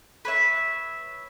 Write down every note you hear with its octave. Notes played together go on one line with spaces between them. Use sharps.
B4 C#5 E5